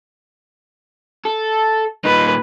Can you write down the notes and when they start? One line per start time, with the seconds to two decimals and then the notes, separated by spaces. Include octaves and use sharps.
1.25 A4
2.05 A#2 D#4 B4